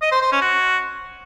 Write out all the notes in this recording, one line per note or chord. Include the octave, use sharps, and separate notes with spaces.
D#5
C5
C5
C#4
F#4